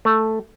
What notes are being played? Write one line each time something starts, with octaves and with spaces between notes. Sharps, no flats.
A3